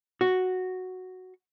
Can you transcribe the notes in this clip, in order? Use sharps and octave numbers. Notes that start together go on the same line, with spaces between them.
F#4